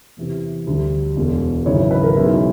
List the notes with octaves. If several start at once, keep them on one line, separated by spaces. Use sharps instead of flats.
E2 C3 E3
D2 D3 G3
E1 E2 B2 G#3
G#1 F#2 C#3 E3 C#5
B4
A#4
B1 B2 G#3 E4